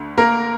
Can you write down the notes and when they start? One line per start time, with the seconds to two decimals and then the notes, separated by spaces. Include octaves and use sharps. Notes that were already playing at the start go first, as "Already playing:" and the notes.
Already playing: D2 D3
0.18 A#3 A#4